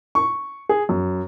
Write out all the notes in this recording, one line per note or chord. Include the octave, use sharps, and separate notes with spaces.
C#6
G#4
F#2